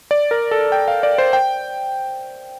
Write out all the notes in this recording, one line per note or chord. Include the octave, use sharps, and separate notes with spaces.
D5
A#4
A4
G5
F5
D5
C5
G5